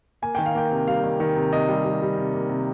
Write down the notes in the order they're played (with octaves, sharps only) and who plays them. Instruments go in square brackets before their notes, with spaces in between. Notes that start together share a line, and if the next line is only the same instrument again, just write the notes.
[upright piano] A#3 G#5
D#3 G5
F5
A#3 G5
C3
G3 F5
D#3
D#3
C3
C3 D#5
G3
G3
G3
C3
A#3
C3